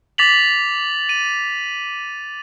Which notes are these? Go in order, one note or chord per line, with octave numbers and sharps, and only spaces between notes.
D6 A6 B6 F7 F#7
D#7